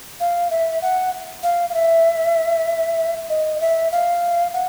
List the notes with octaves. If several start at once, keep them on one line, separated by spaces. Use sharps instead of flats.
F5
E5
F#5
F5
F5
E5
D#5
E5
F5
F#5